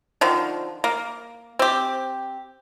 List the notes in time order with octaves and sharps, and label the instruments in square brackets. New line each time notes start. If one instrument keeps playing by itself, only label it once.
[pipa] D3 D#3 F3
A#3
C4 G4